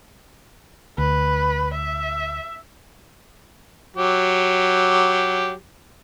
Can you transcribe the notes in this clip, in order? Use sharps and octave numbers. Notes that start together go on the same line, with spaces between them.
D2 B4
E5
F#3 G4